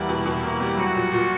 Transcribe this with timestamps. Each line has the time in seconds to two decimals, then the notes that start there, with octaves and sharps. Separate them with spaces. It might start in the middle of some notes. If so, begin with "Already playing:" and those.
Already playing: E2 G3 A#3 E4
0.09 B2
0.25 B2
0.43 A#3
0.60 G3
0.77 F#3 F#4
0.95 A#2
1.11 A#2